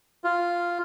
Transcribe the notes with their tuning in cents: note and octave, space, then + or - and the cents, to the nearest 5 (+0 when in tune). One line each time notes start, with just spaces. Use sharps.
F4 -5